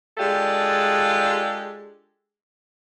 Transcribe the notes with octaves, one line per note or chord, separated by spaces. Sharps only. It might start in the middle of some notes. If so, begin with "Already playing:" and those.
G#3 D4 F4 G4 A4